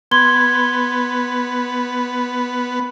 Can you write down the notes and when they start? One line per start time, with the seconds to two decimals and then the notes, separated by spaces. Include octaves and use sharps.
0.11 B3 C6 G#6 G7